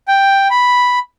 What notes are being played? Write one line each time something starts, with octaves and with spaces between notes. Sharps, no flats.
G5
B5